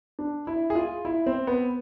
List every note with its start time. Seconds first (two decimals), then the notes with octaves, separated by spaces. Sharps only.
0.19 D4
0.47 E4
0.70 G#4
0.75 F4
1.05 E4
1.26 C4
1.47 B3